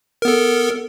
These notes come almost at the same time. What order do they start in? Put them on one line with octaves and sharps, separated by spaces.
A#4 B3 A4